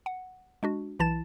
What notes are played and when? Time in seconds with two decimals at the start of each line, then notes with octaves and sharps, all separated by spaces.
0.06 F#5
0.63 G#3 D4 F#4
0.99 B1 E3 E4 A5 A6 E7